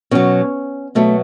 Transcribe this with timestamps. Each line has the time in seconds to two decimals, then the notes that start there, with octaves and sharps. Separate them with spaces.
0.11 B2 F#3 C#4
0.95 B2 F#3 A3